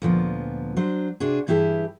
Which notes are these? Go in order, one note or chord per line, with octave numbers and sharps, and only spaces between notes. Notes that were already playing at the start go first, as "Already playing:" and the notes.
D2 A#2 F3 B3
F#3 D4 C5
C3 D4 F#4 G#4
G2 E3 E4 G4 G#4 A5